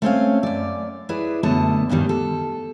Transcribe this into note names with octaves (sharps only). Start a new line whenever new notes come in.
A3 C4 C#4 F5
F#2 D5
E4 G#4 B4 D5
F#2 B2 D3 A3 D#5 A5
G2 A#2 D#3 G3
A4